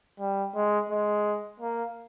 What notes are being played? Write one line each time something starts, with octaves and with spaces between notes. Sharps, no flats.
G3
G#3
G#3
A#3